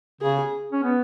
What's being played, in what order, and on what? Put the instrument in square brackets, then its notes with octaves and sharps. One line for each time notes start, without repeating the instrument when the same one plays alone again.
[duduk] C#3 [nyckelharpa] G#4
[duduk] C#4
B3